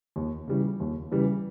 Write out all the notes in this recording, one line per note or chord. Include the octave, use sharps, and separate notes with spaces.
D#2
C#3 E3 G3
D#2
C#3 E3 G3